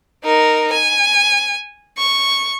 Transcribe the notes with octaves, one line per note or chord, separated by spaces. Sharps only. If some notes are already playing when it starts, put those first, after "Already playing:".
D#4 A#4
G#5
C#6